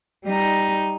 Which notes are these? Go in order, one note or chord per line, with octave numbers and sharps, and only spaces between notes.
G3 D#4